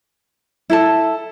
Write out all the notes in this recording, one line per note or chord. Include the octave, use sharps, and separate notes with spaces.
E4 A4 A5